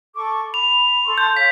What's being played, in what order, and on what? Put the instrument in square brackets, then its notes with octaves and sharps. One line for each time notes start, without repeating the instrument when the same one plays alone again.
[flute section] A4 C#6 D6
[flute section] B5 [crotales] F7
[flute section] A4 C6 C#6
[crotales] G6
[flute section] C#5 F5 [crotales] B6